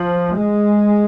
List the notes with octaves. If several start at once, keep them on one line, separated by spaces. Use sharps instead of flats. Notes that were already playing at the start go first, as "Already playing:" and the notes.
Already playing: F3
G#3